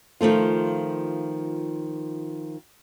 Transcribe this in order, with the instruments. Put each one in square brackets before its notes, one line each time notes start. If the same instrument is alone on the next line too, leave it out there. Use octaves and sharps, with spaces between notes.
[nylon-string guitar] D#3 F3 A3 F4